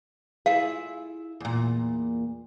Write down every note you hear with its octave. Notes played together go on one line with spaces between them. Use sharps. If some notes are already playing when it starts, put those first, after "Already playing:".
E4 F4 G#4 F5
E2 A#2